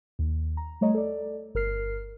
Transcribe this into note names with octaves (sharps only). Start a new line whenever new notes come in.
D#2
A#5
G3 A3 C#5 D#5 A#5
A4 D5
G1 A#4 F6 C7